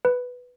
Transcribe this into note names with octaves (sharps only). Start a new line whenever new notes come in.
B4